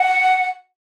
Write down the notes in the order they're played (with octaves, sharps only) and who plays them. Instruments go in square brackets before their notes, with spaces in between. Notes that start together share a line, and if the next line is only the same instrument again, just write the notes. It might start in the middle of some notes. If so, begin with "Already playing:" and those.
Already playing: [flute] F#5